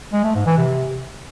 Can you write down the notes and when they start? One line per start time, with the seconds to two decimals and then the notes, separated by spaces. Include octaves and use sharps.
0.13 G#3
0.24 A3
0.35 G#2
0.46 E3
0.57 C3